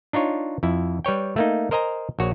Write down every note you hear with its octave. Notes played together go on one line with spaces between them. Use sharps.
D4 D#4 F4 C#5
F2 E4
G3 B4 C#5 G5
A3 A#3 D#4
A#4 C5 D#5 G#5 A#5
A#1 F#4 C#5